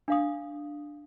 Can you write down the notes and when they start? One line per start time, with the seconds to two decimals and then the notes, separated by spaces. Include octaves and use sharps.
0.08 D4 F5 D#6